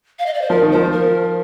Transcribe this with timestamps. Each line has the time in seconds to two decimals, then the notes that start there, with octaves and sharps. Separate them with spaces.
0.19 F5
0.26 D#5
0.34 D5
0.42 C5
0.50 F3 A#4
0.63 D#3
0.72 F3 C5
0.92 A#4